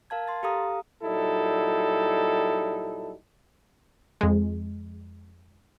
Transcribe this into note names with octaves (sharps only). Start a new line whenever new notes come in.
A#4 F5 A5 G#6
C6 A6
G4 A4 F5 A#5 D#6
A#2 F#3 G3 D#4 E4 A4
F2 G#3